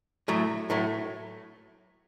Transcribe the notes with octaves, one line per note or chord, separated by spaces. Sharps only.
A2 F#3 A3
A2 F#3 A3